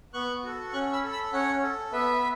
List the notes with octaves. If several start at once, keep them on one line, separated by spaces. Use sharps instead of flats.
B3 C#6 F#6
F#4 A4
C#4 C#6 F#6
B5 E6
A4
B5 E6
C#4 C#5 F#5
A4
B3 B4 E5